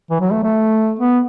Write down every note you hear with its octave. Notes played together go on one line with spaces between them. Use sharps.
E3
F#3
A3
A3
B3